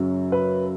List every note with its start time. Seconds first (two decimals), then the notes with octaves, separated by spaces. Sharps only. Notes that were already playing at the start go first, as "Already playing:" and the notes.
Already playing: F#2 C#3 F#3
0.32 B4